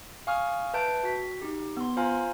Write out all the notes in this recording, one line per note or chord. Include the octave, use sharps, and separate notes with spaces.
F5 G#5 C#6 D#6 F6
B4 E5 A5 G6 D7
F#4 G5 B6
D#4 G4
B3 C6
F4 C5 F5 G#5 A#5 F6